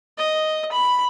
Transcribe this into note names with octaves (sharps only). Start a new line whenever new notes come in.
D#5
B5